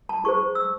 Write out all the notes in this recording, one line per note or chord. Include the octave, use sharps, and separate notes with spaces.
A5
E4 G#4 C5 C#6
E6